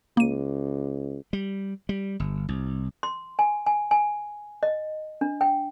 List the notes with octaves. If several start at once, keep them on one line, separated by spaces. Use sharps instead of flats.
C#2 A#3 D#7
G3
G3
G1
C2
C6
G#5
G#5
G#5
D#5
D4
G5